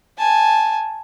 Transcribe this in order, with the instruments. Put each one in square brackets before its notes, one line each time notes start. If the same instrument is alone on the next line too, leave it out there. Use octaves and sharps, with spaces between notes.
[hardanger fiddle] G#5 A5